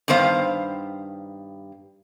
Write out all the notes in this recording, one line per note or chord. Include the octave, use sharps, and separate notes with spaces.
G2 D#3 B3 C5 F5